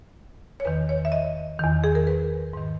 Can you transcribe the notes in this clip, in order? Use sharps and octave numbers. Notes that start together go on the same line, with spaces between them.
C#5
E2 D#3 B4
C#5
E5
D#5
E2 D#3
G#4
A#4
B4
G#2 D#3